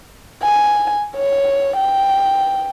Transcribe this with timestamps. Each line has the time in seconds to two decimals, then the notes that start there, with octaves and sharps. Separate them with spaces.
0.43 G#5
1.16 C#5
1.77 G5